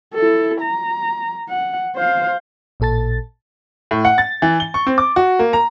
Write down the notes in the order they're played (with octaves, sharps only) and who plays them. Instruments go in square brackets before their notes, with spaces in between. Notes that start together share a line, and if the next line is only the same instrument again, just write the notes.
[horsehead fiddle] E4 A4
A#5
F#5
C5 F5
[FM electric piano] A1 A#2 A4 A5 A6
[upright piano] A2
F#5
A6
E3
G7
C#6
C4
D6
F#4
A#3
A#5